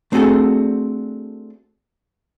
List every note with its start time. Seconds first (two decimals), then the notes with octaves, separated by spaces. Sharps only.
0.12 A3 C4 D4 F#4 G#4 A4